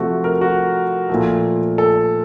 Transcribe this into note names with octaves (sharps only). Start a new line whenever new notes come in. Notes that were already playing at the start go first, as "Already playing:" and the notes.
Already playing: C3 F3 A3 F#4
A#4
F#4
A#2 F3 A3
A4